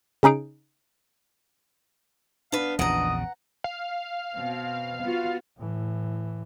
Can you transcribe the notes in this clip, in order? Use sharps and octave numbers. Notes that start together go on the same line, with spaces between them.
C#3 C#4 D#4 G#4 D7
B3 D4 B4 F5
A#1 E2 C#3 D#5 F#5 A#5
F5
B2 C4
B3 F4 F#4
A2 E3